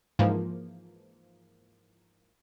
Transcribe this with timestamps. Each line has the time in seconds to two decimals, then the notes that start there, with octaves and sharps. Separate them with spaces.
0.19 G#2 E3 F3 A#3